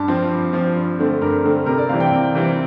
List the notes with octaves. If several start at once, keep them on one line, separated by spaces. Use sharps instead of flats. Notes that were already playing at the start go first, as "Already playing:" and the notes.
Already playing: G2 A5
F3 C4
G2
F3 C4
G2
D3 A3 C4
G2 A#4
D3 A3 C4
C3 A#4
D5
E3 G3 C4 F5
G5
C3
E3 G3 C4